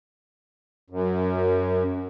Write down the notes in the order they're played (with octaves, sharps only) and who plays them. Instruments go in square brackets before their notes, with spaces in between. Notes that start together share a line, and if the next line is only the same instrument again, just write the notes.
[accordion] F#2